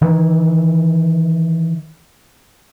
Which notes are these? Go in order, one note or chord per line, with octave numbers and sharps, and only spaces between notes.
D#3 E3